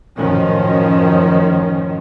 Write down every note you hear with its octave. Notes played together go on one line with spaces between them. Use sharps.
F#2 A2 D#3 F3 C#4